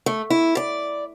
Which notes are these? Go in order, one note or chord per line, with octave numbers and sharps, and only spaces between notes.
A3
E4
D5